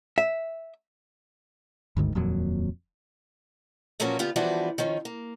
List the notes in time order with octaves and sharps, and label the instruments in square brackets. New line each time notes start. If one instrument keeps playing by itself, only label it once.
[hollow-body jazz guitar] E5
[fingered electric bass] G1 D2 G#2 D#3
D#1 F2 A#2 F#3
[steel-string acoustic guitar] A#2 F3 F#3 A#3 B3 C#4
D3 B3 F4 G4
E3 F3 G3 B3 D4 F#4
D#3 F3 C#4
A#3